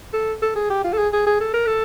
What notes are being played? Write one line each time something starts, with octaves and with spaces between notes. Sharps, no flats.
A4
A4
G#4
G4
F4
A4
G#4
G#4
G#4
A4
A#4
A4